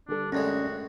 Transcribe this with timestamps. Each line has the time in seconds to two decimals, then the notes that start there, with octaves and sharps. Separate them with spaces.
0.08 D3 G3 D4 A4
0.32 F#2 A2 G#3 C#4 F#4 D5